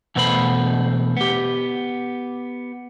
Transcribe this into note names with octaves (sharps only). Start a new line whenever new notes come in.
E2 B2 A3 B4 C5 B5
B3 G4